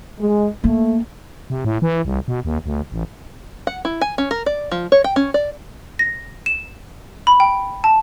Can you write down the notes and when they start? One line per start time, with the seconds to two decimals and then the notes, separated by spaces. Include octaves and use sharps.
0.19 G#3
0.64 A3 A#3
1.50 C3
1.65 A2
1.82 E3
2.05 C2
2.28 B2
2.45 D#2
2.66 D2
2.92 A1
3.67 F#5
3.85 E4
4.01 G#5
4.18 C#4
4.31 A#4
4.46 D5
4.71 F3
4.92 C#5
5.04 G5
5.16 C#4
5.34 D5
5.99 A#6
6.46 E7
7.27 B5
7.40 G5
7.84 A5